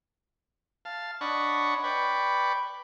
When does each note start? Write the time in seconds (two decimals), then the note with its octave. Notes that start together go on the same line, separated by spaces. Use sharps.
0.85 F5 A5
1.21 D4 C#5 D#5 F#5 B5 C#6
1.84 B4 D5 G5 B5 C#6